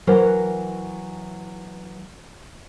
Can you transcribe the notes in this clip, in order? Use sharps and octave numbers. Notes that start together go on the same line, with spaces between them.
E3 F#3 E4 A#4 C5